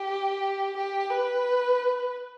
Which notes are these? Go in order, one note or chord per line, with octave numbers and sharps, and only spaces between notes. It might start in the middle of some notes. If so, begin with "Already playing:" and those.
Already playing: G4
G4
B4